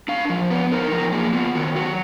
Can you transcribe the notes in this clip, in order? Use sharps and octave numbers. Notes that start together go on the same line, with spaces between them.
D4 F5
F3
B3 B4
D#4 A#4
F3 A#4
A#3 G#4
B3 F4
D#3 F#4
F#3 F#4